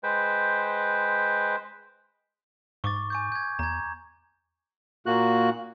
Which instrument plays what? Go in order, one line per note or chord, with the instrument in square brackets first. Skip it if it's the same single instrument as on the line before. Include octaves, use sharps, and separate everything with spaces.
[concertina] G#3 B4 C5 G5
[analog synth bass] G#2 [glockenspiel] C#6 D6 A6
[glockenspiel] G#5 C#6 G6
G6 G#6
[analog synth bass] E2 [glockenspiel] A#5 G#6
[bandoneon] A#2 A#3 F#4 F#6